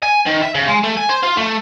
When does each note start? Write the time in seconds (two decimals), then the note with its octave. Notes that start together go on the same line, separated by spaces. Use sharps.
0.03 G#5
0.26 D#3
0.43 E5
0.55 C#3
0.68 G#3
0.83 A3
0.97 G#5
1.09 C5
1.23 F4
1.37 A3